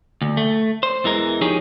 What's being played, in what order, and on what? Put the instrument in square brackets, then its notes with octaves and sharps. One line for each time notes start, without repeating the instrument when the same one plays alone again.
[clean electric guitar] D2
A3
C5
E2 E3 G#3 A#4
F3 D#4 G4 G#4 C#5